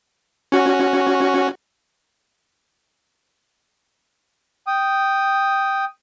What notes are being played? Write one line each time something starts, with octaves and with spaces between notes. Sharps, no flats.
C#4 F#4
G5 D#6